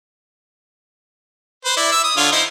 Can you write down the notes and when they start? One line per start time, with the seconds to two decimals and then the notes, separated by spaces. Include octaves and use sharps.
1.65 B4 C5
1.77 E4 D5
1.92 E5
2.04 D#6
2.17 D3 F4 C#5
2.32 D#4 E4 C5